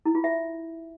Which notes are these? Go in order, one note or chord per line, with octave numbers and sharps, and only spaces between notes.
E4
F4
E5